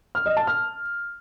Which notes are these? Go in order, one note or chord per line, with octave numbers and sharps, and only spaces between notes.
F6
D#5
A5
F6